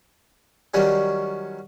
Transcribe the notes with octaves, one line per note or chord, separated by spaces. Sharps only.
D#3 F#3 G3 C#4